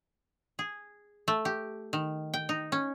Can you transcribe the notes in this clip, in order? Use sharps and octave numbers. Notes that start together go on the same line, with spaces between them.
G#4
A3
G4
D#3
G5
D#4
C#4